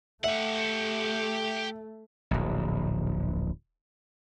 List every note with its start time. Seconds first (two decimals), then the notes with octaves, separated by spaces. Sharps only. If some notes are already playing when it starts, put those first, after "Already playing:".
0.24 A3 G4 E5 F#5
2.31 D1 A#1